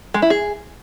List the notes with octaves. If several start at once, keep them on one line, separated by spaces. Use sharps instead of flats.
G#3
E4
G#4